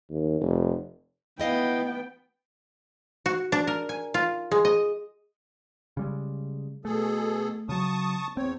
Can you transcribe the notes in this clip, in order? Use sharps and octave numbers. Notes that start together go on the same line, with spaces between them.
D#2
F1
B3 E4 D#5 F5 G5
F#4
D4
A#4
G#5
F4
G#3
D#5
C#3 G3 G#3
B2 A3 G#4 A4
C#3 F#3 A5 C#6 D#6
E2 C4 C#5